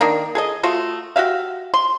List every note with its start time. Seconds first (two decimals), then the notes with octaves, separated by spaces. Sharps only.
0.01 D#3 A#3 D4
0.35 G#4 A4 D#5
0.63 A3 F4 F#4
1.16 F#4 G4 E5 F5
1.74 C6